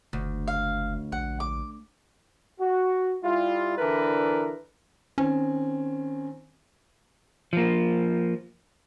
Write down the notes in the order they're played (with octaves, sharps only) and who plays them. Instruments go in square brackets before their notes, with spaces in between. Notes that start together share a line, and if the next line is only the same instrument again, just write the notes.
[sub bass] F#1 [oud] D2
[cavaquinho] F5
[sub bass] A#1 [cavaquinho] F#5
[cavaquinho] D6
[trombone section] F#4
G3 E4 F4
D3 E3 D4 E4 A#4 B4
[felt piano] D#3 C4 G#5 [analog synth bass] C#4
[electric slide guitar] F3 A#3